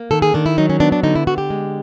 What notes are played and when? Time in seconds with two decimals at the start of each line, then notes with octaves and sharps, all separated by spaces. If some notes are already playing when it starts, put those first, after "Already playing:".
Already playing: A#3
0.11 D#3 A4
0.22 G#4
0.34 D#3 D4
0.46 E4
0.57 F#3 D#4
0.70 C#4
0.80 B3 D4
0.92 D4
1.03 D3 D#4
1.15 E4
1.27 D3 F#4
1.38 G4
1.50 G#3